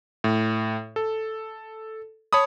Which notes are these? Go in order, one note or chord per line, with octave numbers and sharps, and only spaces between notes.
A2
A4
C#5 A5 B5 D#6